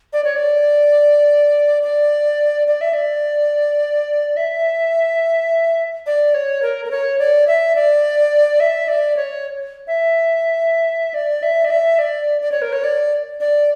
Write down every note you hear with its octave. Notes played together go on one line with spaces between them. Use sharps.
D5
C#5
D5
D5
D5
E5
D5
E5
D5
C#5
A#4
A#4
C#5
D5
E5
D5
E5
D5
C#5
E5
D5
E5
D5
E5
D5
D5
C#5
A#4
C#5
D5
D5